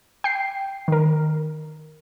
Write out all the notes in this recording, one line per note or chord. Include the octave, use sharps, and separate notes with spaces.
G5 C7
D#3 A#4